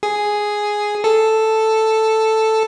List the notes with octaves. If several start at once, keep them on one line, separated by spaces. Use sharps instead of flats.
G#4
A4